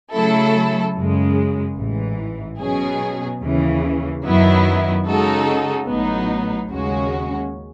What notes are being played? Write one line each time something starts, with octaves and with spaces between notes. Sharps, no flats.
C#3 F#3 A3 E4 A4
F#2 C#3 G#3
A1 G#2 E3
B2 F#3 C#4 G#4
D#2 C#3 E3
F#2 D#3 F#3 B3 E4
C#3 G#3 D#4 F#4 A4
A1 A2 F#3 B3 D#4
D#2 C#3 G#3 C#4 F#4